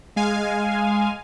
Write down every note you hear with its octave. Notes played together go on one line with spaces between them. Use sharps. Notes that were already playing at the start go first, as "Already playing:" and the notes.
G#3 F5 G#5